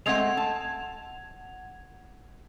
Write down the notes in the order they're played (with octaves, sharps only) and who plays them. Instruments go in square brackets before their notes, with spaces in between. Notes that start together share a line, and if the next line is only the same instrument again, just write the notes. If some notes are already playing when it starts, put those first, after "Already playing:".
[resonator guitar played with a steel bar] G#3 A3 C4 [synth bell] F#5 G#6 F7
[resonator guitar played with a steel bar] A5